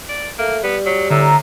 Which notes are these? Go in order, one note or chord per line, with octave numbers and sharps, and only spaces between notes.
D5
A3 A#3
G3 B3
F#3
A2 D3 A#5 E6